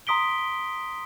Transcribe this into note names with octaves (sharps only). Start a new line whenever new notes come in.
A#5 C6 D#6 B6 D7 G7